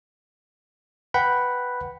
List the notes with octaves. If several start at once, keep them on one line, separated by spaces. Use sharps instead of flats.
B4 F#5 G5 B5